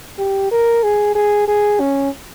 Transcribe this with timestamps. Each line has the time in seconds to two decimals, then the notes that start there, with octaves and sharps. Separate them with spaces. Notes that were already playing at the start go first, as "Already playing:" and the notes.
0.19 G4
0.51 A#4
0.84 G#4
1.15 G#4
1.48 G#4
1.80 C#4